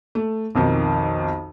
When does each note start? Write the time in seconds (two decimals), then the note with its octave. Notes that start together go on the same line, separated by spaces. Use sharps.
0.15 A3
0.55 B1 F2 D#3